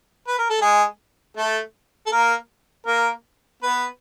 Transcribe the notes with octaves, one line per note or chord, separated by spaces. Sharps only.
B4
A#4
A4
G#3 G#4
A3 A4
A4
A#3 A#4
A#3 A#4
B3 B4